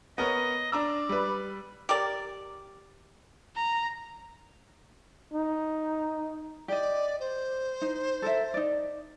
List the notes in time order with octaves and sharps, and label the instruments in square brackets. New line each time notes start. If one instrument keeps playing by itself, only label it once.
[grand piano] B3 A#4 C#5 [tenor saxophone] D#5
[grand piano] D4 A#5 E6 [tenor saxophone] D5
[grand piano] G3 B4
[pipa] G4 A#4 D5
[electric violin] A#5
[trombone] D#4
[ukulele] G4 D#5 [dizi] D5
[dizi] C5
[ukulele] D#4
A4 A#4 E5
D#4 D5